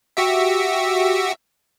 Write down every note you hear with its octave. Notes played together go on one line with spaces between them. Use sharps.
F#4 G4 E5